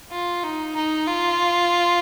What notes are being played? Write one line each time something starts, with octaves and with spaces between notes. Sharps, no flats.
F4
D#4
D#4
F4